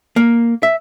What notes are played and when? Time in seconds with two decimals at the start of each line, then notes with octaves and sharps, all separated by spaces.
0.16 A#3
0.63 E5